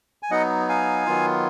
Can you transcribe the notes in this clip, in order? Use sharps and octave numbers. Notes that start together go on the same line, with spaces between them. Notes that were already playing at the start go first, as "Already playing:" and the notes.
G#5
F#3 B3 D#4 D#5 F#5
F5 G#5
D#3 F#3 B3 F4